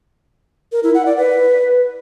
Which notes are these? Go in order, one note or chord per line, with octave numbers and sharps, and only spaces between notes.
A#4
E4
F#5
D5
B4